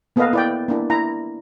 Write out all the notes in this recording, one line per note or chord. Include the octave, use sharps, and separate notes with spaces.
A#3 B3 A4 B4 D#5 F5
E4 D5 G5
A#3 D4 E4
E4 A#5